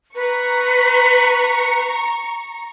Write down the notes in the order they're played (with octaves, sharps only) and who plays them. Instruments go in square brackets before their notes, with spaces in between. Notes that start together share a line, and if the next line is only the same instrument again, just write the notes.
[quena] B4 [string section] A#5 C#6